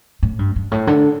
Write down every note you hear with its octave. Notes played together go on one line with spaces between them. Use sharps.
A2
G2
G2
A2
D3